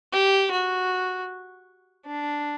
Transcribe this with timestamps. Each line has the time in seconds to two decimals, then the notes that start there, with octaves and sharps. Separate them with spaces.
0.12 G4
0.51 F#4
2.06 D4